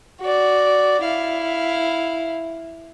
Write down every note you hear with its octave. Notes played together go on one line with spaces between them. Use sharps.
F#4 D5
E4 F5